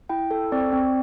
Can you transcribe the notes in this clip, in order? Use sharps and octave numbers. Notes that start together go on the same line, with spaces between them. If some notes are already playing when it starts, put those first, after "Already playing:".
E4 G5
A4
C4 D5
C4